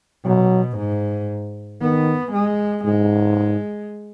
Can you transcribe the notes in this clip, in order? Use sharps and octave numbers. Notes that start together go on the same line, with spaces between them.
B2 F#3
G#2
D#3 B3
G#3
G#2 G#3